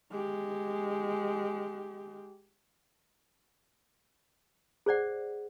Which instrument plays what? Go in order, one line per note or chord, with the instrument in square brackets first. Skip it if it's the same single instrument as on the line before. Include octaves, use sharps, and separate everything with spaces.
[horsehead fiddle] G#3 G4
[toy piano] G#4 C5 D5 F#5